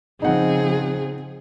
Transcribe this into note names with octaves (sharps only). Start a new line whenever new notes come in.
C#3 F3 C4 D#4 G#4 F#5